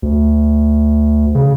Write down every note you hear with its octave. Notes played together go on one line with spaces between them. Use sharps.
D2
C#3